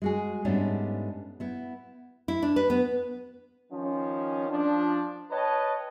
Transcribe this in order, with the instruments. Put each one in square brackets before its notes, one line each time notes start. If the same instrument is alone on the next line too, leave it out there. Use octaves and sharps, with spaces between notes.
[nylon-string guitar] G#3 F#4 G#4
G#2 G3 A3 B3 C#4 D4
B3 E4
E4
D4
B4
B3
[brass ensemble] D#3 F3 C#4
F3 D4
B4 C#5 D#5 G5 A5